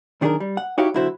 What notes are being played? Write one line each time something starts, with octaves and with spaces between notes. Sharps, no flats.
B1 D#3 D4 G4 G#4 A#4
G3
F#5
D#4 E4 F#4 G4 C#5 F5
B1 D3 E4 F#4 C5